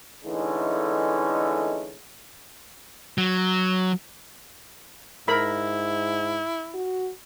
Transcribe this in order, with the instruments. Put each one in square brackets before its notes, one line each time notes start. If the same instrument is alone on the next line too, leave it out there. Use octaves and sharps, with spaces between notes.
[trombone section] D3 E3 G#3 A3 C#4 D#4
[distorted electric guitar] F#3
[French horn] G#2 [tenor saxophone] E4 [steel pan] A#4 B5
[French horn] F#4